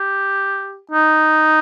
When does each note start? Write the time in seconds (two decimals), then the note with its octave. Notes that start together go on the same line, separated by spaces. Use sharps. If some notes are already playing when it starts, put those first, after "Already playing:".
Already playing: G4
0.91 D#4